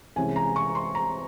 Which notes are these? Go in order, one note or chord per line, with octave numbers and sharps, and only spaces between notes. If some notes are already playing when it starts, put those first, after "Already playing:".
C2 C3 E3 G#3 C#4 G#5
A#5
C#6
C6
A#5